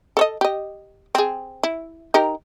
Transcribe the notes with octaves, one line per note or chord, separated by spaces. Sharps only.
A4 C#5 D#5
G4 D#5
C4 G#4
E4
D#4 G4 A#4